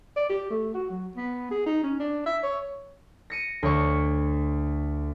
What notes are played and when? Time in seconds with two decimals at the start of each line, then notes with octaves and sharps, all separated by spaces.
0.16 D5
0.29 G4
0.50 A3
0.74 F#4
0.90 F#3
1.16 B3
1.51 G#4
1.66 D#4
1.83 C#4
1.99 D4
2.26 E5
2.43 C#5
3.30 A#6 C#7 D#7
3.63 D2 C#5 C#6